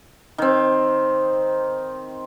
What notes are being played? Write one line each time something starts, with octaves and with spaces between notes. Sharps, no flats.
D#3 C4